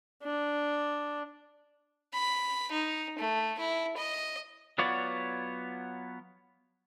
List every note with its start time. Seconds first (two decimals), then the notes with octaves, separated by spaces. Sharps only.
0.23 D4
2.13 B5
2.71 D#4
3.19 A3
3.59 E4
3.97 D#5
4.78 F#3 B3 F4 C#5 D5